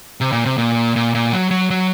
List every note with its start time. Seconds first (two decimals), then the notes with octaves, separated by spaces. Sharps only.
0.21 C3
0.32 A#2
0.45 C3
0.58 A#2
0.96 A#2
1.15 A#2
1.33 F#3
1.51 F#3
1.70 F#3